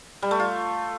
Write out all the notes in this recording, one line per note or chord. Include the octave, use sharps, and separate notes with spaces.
G3
A3
F4